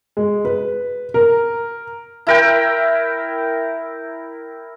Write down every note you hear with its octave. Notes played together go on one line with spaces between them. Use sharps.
G#3
B4
A#4
E4 A#4 G5